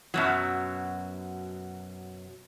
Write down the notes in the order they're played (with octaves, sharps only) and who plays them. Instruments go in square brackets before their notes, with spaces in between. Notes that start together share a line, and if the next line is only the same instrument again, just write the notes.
[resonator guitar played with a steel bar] F#2 B2 F#3